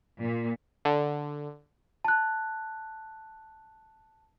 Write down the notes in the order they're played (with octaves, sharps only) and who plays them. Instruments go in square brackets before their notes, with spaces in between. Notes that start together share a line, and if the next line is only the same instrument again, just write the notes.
[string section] A#2
[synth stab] D3
[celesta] A5 F#6